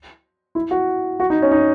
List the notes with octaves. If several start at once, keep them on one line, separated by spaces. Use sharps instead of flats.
E4
F#4
F#4
D#4
C#4
D#4